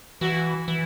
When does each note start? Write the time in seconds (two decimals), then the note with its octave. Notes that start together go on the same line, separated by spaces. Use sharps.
0.21 E3 F#4
0.68 E3